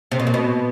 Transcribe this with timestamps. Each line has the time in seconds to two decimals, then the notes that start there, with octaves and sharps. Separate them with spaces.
0.12 C3
0.20 B2
0.27 A#2
0.34 B2